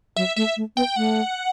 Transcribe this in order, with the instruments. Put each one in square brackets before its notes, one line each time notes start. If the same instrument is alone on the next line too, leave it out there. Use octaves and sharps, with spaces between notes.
[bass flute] F#3 [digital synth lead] E5
[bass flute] A3 [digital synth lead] E5
[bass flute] A3
[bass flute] B3 [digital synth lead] G5
[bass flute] A3 [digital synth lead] F#5